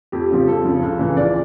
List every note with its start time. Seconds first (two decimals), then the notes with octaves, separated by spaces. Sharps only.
0.12 F2 G4
0.30 C#3 F3
0.47 F2 A4
0.65 C#3 F3
0.82 C#2
0.99 C#3 E3
1.17 C#2 D5